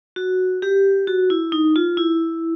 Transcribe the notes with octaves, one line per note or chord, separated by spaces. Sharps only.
F#4
G4
F#4
E4
D#4
F4
E4